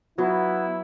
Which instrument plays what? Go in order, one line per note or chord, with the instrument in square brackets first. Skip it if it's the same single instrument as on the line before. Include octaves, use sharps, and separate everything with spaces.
[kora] F#3 [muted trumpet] B3 [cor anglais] E4